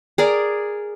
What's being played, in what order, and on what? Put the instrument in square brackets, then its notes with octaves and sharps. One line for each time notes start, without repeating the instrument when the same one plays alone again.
[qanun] G#4 A#4 D5